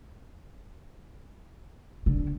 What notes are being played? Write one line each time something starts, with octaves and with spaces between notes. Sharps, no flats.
D3